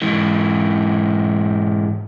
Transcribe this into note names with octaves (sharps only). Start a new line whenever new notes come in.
G#2 E3